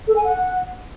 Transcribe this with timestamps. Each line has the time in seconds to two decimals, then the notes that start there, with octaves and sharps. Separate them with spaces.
0.07 A4
0.16 G#5
0.24 F#5